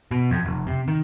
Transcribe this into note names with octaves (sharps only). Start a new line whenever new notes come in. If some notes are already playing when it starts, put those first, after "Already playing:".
B2
F2
F1
C3
D#3